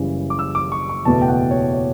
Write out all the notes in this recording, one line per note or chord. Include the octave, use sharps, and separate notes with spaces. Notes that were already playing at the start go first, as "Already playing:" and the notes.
Already playing: F#1 F#2 C#3 E3 G3
D6
E6
D6
C#6
C#6
F#1 E2 B2 A3 A5
G5
F#5
C#5
C#5